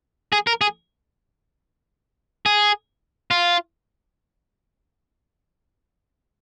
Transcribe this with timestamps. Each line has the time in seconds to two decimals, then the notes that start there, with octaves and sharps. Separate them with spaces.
0.33 G#4
0.47 A#4
0.61 G#4
2.46 G#4
3.31 F4